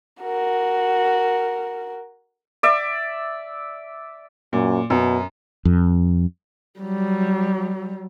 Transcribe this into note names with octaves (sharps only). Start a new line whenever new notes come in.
F#4 A#4
D5 E5
F#2 A#2
F#2 B2
F2
F#3 G3